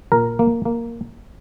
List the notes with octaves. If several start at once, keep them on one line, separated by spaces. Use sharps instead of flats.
A#2 A#4
A#3
A#3